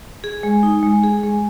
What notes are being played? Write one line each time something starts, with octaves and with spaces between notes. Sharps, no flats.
G#4
G#3
D#4
G#3
G#4
G#3